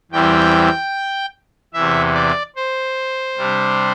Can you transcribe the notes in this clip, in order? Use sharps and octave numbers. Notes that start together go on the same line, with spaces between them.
E2 E3 G3 C4 G5
E2 C3 E3 E5
D5
C5
C3 G3 D4